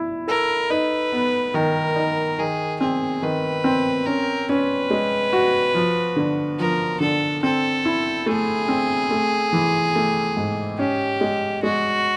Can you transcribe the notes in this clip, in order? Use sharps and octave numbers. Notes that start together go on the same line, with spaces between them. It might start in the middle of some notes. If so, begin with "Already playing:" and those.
Already playing: E4
A4 A#4
D#4 B4
B3
D#3 A#4
D#4
D#3 G#4
C4 G#4
D#3 B4
C4
C#4 A#4
C#4 B4
G#3
F#4
F3
D3
F3 A#4
D3 A4
C4 A4
E4
A3 G#4
C4
A3
E3
A3
G#2
C#4 G4
G#3
G#3 F#4